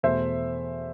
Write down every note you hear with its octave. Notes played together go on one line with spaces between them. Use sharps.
E2 B2 A3 C5 E5